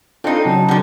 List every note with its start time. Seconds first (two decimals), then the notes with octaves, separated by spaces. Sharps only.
0.24 C4 D4 D#4 F4 A4
0.45 C#3 F#3 A5
0.68 D3 D#3